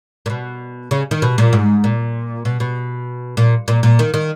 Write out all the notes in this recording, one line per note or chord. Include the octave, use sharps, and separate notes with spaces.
A#2
B2
C#3
D#3
B2
A#2
G#2
A#2
B2
B2
A#2
A#2
A#2
D#3
D#3